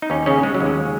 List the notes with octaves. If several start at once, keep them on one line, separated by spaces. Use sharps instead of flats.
D#4
D#2 C#4
C#3 C#4
C#3 G#3
F#3
D#2
G#3